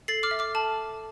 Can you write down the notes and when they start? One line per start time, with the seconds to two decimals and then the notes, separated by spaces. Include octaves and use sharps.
0.08 A4 A6 C7
0.23 D6 F6
0.31 E5
0.39 D6 F6
0.55 A4 A5